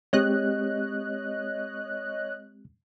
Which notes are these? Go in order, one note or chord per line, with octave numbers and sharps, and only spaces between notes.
G#3 C4 G4 C#5 D#5 F#6